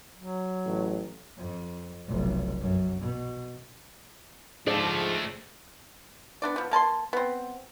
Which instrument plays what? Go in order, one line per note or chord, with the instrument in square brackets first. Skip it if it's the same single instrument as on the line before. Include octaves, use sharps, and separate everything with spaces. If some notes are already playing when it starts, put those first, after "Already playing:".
[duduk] F#3
[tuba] A1
[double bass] F2
F1 B1
F#2
B2
[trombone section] G#2 F3 [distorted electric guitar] A3 D4 [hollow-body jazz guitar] G#4 C5 D5
[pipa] B3 D4 D5
F3 B3
A#3 A5 B5 C6
B3 C4